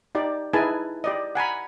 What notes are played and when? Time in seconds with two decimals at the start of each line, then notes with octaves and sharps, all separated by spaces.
0.15 D#4 G4 D5
0.53 D#4 E4 G#4 B4 G#5 A5
1.04 G4 D5 D#5
1.35 F#5 G#5 A#5 B5